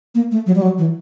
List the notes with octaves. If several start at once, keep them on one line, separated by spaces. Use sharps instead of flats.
A#3
A3
F#3
G3
F#3
E3